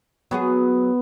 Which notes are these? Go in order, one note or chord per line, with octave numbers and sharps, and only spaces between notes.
F#3 B3 F#4 G#4